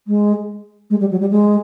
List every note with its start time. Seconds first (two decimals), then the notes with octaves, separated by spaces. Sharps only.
0.07 G#3
0.90 G#3
1.00 G3
1.11 F#3
1.20 G3
1.31 G#3